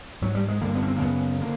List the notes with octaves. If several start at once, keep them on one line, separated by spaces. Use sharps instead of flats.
G#2 F#3
G3
G#3
G2 D3 A#3
B3
C#4
C4
A#3
F#2 C#3 B3
D3 A#3